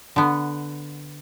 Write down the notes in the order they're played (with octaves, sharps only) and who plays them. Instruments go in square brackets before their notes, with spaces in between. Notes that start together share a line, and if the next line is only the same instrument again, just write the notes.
[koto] D3 B3